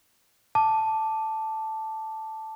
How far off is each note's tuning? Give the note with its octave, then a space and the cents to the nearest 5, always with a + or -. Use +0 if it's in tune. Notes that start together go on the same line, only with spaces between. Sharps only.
A5 +0 D6 +0